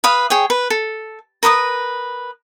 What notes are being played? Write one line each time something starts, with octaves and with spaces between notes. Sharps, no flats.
B4 F5 D#6
G#4 C#5 G5
B4
A4
A#4 B4 D6 D#6